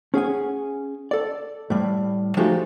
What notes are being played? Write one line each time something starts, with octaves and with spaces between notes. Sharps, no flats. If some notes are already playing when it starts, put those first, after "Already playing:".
C#4 G#4 F#5 G#5
A4 D5
A2 G3
F3 G#3 A3 D#4 F#4 G4